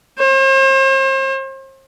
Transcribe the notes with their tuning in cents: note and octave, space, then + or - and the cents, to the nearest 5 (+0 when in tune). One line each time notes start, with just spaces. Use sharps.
C5 +40